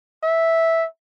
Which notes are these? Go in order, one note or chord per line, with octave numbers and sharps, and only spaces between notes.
E5